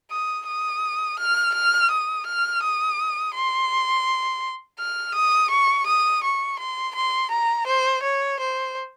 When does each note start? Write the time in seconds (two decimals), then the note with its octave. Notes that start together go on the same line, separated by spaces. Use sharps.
0.11 D#6
0.47 D#6
1.19 F6
1.54 F6
1.91 D#6
2.26 F6
2.63 D#6
3.35 C6
4.79 F6
5.15 D#6
5.51 C#6
5.87 D#6
6.24 C#6
6.59 C6
6.95 C6
7.31 A#5
7.67 C5
8.03 C#5
8.40 C5